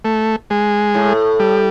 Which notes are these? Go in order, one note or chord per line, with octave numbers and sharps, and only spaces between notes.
A3
G#3
A2
G3